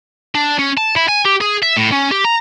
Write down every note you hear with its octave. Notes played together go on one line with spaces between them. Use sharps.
D4
C#4
A5
E4
G#5
G4
G#4
E5
A2
C#4
G4
A#5